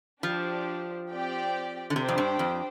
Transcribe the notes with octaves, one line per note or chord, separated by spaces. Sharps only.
F3 D4 G4 C5
C4 G4 D5 G5
D3
C3 D4 G4 C5 G5
F2
G2
F2